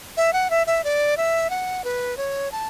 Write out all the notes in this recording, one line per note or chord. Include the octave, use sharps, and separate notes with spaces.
E5
F#5
E5
E5
D5
E5
F#5
B4
C#5
A5